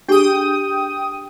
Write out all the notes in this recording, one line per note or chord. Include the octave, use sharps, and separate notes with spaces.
D4 G4 G#4 G5 D#6